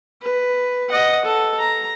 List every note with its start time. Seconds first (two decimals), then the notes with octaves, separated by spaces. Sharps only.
0.22 B4
0.89 D#5 F#5
1.25 A4
1.59 A#5